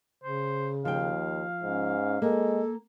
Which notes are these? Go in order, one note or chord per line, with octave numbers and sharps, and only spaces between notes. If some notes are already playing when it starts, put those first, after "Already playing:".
C#3 C5
D#2 F3 F5 G5
G#2 C#4
G#3 A#3 A4